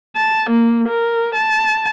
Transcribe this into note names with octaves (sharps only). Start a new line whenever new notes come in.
A5
A#3
A#4
A5